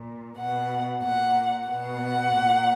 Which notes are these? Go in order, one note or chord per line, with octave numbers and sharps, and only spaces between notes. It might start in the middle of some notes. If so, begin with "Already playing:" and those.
Already playing: A#2
B2 F#5
A#2 F#5
B2 F#5
A#2